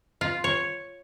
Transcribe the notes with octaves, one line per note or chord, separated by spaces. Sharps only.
F4
C#5